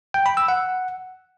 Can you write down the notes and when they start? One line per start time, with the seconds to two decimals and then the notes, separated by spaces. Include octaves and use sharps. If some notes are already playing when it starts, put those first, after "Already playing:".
0.14 G5
0.26 B5
0.37 E6
0.48 F#5